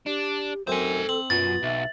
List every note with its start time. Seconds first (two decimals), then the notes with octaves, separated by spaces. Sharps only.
0.06 D4 G4
0.67 F#2 C4 A4 C5 G#5
1.09 C4 F#7
1.30 F#2 B2 F4 A6
1.63 B1 E5